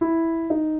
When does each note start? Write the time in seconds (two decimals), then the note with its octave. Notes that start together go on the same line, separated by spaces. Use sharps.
0.01 E4
0.50 D#4